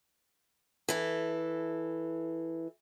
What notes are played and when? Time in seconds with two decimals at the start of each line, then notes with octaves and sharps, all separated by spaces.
0.89 E3 A4